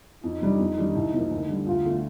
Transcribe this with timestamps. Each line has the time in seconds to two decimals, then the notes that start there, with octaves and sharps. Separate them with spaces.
0.24 F2 D#4
0.42 C3 G3 D4
0.59 F2
0.77 D#3 G3 D4
0.95 C2
1.13 C3 F3 A#3
1.31 D2
1.49 D3 G3
1.67 D2 F4
1.84 D3 A3